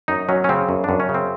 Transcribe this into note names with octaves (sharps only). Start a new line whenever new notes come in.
F#2 D#4
F#3 C#4
C#4
C#3 C4
F#2
F#2 D4
C#4
C#3
C4